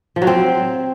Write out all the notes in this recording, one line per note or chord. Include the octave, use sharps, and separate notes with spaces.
F3
F#3
C4